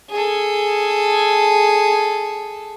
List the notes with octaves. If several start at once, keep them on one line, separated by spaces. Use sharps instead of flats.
G#4 A4